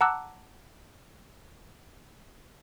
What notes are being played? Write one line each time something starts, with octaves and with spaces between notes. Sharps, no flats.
F#5 A5 A#5 D6 E6 F#6